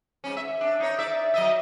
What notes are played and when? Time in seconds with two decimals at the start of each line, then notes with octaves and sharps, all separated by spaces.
0.24 G#2 C#4
0.37 E5
0.61 D4
0.80 D#4 C#5
0.99 D5 E5
1.34 F#3 D#5 E5